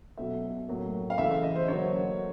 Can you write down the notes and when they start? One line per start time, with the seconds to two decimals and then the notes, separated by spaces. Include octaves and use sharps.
0.17 B2 F#3 A3 E5
0.68 A2 F#3 A#3
1.10 F5
1.18 C#3 E3 A3 E5
1.31 E5
1.43 D#5
1.56 C5
1.68 D3 F#3 A#3 C#5